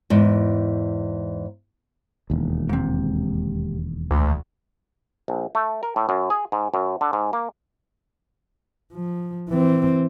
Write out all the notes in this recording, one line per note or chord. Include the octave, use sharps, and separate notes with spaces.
E2 G#2
E1 D#2
G#2 C3
D2
A#1
A3
A#4
A2
F#2
G#4
G#2
F#2
D3
G#2
A#3
F3
E3 C4